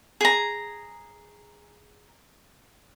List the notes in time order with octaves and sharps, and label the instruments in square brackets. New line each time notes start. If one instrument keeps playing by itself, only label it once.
[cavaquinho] G#4 A#5